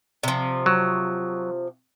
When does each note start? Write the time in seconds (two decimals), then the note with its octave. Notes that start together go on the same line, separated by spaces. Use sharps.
0.23 C3 F3
0.66 F#3